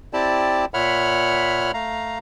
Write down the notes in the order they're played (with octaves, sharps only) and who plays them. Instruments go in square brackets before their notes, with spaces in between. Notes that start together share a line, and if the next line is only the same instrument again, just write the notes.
[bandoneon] C4 E4 G4 D5 A5
A#2 C#5 E5 F#5 B5 F6
A3 F5 A#5